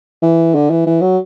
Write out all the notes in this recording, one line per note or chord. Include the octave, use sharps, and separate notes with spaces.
E3
D3
E3
E3
F#3